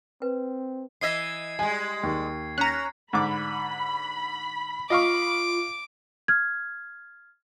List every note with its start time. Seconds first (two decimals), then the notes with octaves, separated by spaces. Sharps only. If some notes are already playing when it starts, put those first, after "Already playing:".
0.22 C4 B4
1.01 E3 D#5 E5 G#6 C7
1.59 G3 G#3 G#5
2.03 D#2
2.58 C#4 A#5 F#6
3.13 G#2 D3 B5 D6
4.90 F4 D#5 F5 C#6 D6
6.28 F6 G#6